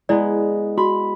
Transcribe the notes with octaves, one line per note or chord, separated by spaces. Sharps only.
G#3 B3 E4 D5
F#4 B5